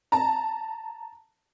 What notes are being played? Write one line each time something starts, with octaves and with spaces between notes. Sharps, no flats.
A5 A#5